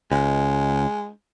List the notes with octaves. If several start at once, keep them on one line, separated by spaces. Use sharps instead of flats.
C#2 G#3